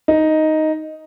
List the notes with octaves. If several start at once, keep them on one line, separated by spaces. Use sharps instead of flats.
D#4